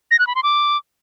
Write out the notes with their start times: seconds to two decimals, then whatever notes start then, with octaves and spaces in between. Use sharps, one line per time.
0.11 A#6
0.19 F#6
0.27 B5
0.35 C6
0.43 D6